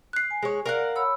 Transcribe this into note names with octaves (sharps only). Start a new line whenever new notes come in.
F#6 C7
G#5
G#3 C#5
A#4 D5 F5 F#5
C#5 B5 E6